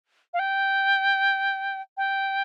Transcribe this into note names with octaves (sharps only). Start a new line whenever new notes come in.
F5
G5
G5